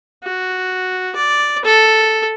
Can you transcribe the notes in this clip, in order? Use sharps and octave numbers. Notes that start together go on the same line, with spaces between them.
F#4
D5
A4